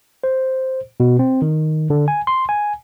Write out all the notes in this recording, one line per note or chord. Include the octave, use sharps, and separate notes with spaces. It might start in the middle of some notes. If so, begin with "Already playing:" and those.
C5
B2
C4
D#3
D3
G#5
C6
G#5